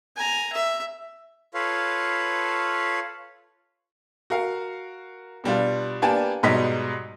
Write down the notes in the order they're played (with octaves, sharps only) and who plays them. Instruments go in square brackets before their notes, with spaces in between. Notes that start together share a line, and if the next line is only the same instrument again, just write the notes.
[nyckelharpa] G#5 A#5
E5
[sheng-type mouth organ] F4 A4 B4 C#5 F5
[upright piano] F#4 A#4 F5
B2 G3 D4 F4
A#3 B3 D4 G4 G#5 A5
G#2 B2 F#3 G3 D#5 B6